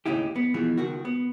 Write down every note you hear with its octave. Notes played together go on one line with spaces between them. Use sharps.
D#2 A2 C#3 D#4 E4 G4
B3
B2 E3 F3 G#3
C#2 D#3 F#4
B3